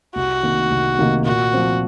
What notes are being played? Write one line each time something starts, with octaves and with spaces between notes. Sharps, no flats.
C2 F#4
C3 D#3 A#3 D#4
C2
C3 D#3 A#3 D#4
A#2 F#4
F3 C4